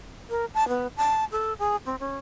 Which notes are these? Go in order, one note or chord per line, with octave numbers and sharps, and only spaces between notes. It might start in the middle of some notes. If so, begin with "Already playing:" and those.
A#4
A5
B3
A5
A4
G#4
C4
C#4